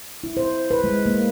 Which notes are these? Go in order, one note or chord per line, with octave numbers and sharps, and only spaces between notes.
E4
C5
B4
G#3
A#3